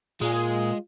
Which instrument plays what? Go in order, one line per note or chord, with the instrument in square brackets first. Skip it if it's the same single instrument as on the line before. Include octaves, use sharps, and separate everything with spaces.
[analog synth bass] A#2 [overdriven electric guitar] G#3 [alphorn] F4 [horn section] G#4